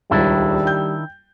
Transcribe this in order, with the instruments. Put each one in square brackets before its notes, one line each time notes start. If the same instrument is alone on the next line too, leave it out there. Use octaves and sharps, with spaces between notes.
[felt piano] D#1 C#2 [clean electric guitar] D#3 D4 E4 [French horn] G3
[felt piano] G5 G6